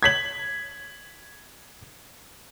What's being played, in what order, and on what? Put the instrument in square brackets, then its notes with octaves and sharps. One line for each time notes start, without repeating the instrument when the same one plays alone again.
[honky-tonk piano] G#6 B6 F#7